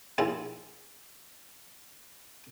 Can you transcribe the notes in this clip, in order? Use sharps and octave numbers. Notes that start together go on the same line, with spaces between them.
A#1 D#2 E4 F4 G#4